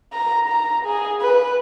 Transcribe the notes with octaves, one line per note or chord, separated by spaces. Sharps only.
A#5
A#5
G#4
B4